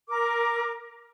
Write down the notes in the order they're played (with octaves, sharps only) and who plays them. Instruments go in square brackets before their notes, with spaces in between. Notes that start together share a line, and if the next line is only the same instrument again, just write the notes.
[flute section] A#4 D6